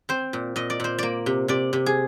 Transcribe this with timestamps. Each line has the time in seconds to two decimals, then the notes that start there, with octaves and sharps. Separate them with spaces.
0.09 C4 C5
0.33 A#2
0.56 A#2 D#5
0.70 D5
0.80 A#2 C5
0.98 A#3 D5
1.26 C3
1.48 C3 D5
1.73 C3
1.86 G#4